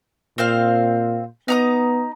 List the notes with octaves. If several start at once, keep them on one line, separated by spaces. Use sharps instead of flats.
A#2 C4 C5 F5
B3 D#4 A#5 D#6